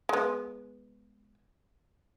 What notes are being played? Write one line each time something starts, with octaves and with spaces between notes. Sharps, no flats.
G#3 B3